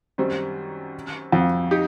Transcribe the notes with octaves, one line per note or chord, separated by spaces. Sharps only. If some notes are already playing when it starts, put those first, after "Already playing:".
F#2 D#3 G3 C4
F2
D#4 G4